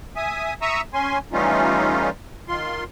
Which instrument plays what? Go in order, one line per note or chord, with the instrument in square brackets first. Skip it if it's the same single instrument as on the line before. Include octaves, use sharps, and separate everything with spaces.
[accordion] E5 G#5 D#6
E5 A#5 C#6 D#6 E6
C#4 G#5 C6
E3 G3 A3 C#4 D#4 F4
D#3 F4 C6